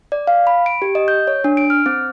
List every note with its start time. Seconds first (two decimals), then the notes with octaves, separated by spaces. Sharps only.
0.12 D5
0.27 F5
0.47 B5
0.66 D7
0.82 G4
0.95 D#5
1.08 G6
1.27 C#5
1.44 D4
1.57 D7
1.70 F6
1.86 C4